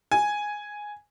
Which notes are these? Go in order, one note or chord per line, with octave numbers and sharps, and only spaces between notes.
G#5